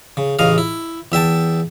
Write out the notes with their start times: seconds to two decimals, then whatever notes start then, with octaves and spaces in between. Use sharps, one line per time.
0.17 C#3
0.39 A1 C#3 D#5 F5
0.58 E4
1.12 E2 E5 G5 A5